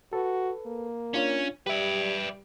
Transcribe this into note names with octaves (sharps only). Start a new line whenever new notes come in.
F#4 A4 B4
A#3
C#4 D4 F4 C#5
G3 G4 B4 D5 E5